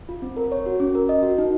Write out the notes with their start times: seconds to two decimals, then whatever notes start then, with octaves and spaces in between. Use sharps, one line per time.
0.09 F4
0.22 C4
0.37 A#4
0.52 C#5
0.66 F#4
0.80 C#4
0.95 A#4
1.09 D#5
1.23 F#4
1.38 D#4